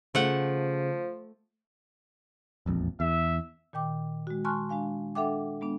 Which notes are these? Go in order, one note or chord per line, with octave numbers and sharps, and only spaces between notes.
C#3 F3 A3 F#5
E1 A#1 F2
E2 E5
A#2 D#3 G5 D6
G#3 F#4
G#5 A5 C6 C#6 F6 F#6
G#3 D4 F5 G#5
D4 A4 E5 F#5 G5 D6
G#3 B3 D4